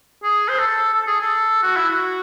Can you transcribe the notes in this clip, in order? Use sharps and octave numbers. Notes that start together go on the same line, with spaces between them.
G#4
C5
A4
A4
G#4
A4
F#4
E4
F#4